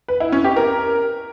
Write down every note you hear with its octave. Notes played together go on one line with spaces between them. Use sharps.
B4
E4
C#4
G4
A#4